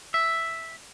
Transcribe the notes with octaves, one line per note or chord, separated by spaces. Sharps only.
E5